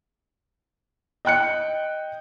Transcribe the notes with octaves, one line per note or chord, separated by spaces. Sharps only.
D#5 G5 F#6 C#7